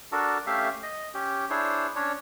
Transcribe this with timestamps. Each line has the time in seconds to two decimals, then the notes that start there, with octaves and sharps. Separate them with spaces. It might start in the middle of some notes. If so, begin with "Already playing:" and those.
0.12 D4 F#4 A4 A#4
0.47 A3 C#4 G4 E5 F5
0.83 D#5
1.14 C#4 G4
1.50 D4 E4 G#4 C5 C#5
1.96 C#4 D4 C#5